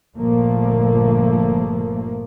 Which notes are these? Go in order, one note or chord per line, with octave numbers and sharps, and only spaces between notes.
G1 A#2 F3 A3 A#3